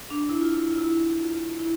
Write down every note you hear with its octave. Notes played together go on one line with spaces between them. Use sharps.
D4
E4
F4
E4
F4
E4
F4
E4